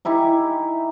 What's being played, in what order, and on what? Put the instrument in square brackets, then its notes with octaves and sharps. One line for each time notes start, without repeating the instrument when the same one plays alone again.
[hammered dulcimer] D#4 E4 G4 G#5